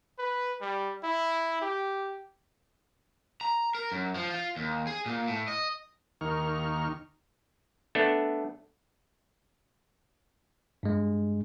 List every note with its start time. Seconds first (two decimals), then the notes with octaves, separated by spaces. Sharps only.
0.18 B4
0.61 G3
1.03 E4
1.62 G4
3.41 A#5
3.75 A#4
3.92 F#2
4.15 F3
4.30 F4
4.56 D#2
4.87 G#4
5.06 A#2
5.28 A2
5.48 D#5
6.21 D#2 D#3 A#3 C#6 F6
7.95 A3 B3 D4 A4
10.83 G2 G#3